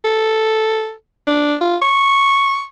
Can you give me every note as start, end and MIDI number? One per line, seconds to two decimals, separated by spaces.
0.05 0.93 69
1.27 1.55 62
1.61 1.76 65
1.82 2.64 85